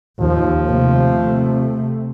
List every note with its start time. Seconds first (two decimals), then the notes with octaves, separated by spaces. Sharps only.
0.21 D#2 F3
0.67 C3 A3